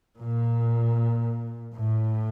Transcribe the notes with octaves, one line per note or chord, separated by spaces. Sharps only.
A#2
A2